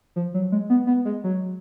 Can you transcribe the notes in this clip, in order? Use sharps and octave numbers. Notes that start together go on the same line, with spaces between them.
F3
F#3
G#3
B3
B3
G#3
F#3